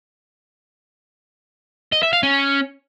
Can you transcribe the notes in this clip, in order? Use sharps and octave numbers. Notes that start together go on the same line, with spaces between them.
D#5
E5
F5
C#4